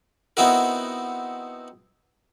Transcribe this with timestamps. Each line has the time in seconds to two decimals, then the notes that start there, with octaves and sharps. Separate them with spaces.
0.37 B3 C4 D#4 E4 F#4 A#4